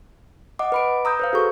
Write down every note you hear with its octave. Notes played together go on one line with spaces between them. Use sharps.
D#5 F#5 D6
B4 B5 D7
A#5 D#6 E6 G6
B4 C5 F5
F#4 G#4 A4 C#6